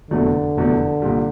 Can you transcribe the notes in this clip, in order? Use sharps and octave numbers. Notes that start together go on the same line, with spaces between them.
F1 E2 B2 D3 F#3 A3
F1 E2 B2 F#3 A3
C2 A#2 G3